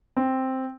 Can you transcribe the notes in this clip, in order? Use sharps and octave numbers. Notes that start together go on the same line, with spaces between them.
C4